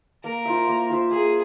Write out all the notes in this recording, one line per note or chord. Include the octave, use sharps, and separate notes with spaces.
A#3 A#4
F4 C5 E5
A#3
F4 C5 E5
A#3 G#4